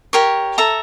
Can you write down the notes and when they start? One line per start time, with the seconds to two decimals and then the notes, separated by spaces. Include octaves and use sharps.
0.13 G4 A#4 C#5
0.58 A4 E5 A#5